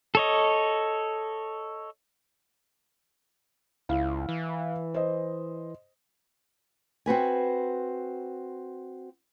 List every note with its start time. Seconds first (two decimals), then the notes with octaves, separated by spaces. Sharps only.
0.15 A4 C#5 D#5
3.89 C#2 E4 F5
4.29 E3
4.94 C5 D#5
7.06 C4 F#4 B4 G#5